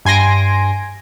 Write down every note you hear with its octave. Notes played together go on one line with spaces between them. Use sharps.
G2 G#5 C6 A#6 D7